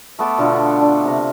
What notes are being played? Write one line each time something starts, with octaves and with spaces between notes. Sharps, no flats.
A3 B3 A5 D6
B2 D3 A3 F4
D4
C3 A#5